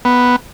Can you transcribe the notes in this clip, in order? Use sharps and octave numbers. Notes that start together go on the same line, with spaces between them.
B3